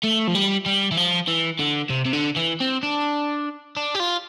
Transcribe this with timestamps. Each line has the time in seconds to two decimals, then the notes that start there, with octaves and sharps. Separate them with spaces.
0.03 A3
0.27 F3
0.35 G3
0.66 G3
0.91 E3
0.97 F3
1.27 E3
1.59 D3
1.90 C3
2.06 C3
2.13 D3
2.36 E3
2.60 C4
2.83 D4
3.77 D4
3.95 G4
4.00 F4